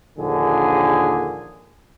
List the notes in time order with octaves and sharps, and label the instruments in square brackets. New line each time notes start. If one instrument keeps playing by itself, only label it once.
[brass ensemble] A#1 D#2 A#2 D3 A#3 G#4